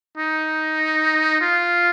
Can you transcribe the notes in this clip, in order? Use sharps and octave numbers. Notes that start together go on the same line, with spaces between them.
D#4
F4